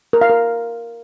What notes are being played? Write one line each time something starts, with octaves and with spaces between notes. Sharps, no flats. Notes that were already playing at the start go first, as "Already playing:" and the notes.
A#4
F5
A#4